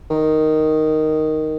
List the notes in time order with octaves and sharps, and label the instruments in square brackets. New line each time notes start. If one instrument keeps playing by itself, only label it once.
[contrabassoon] D#3